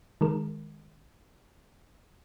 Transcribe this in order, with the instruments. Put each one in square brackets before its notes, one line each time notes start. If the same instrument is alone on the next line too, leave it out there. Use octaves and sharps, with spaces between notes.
[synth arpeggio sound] D#3 G#3 A#4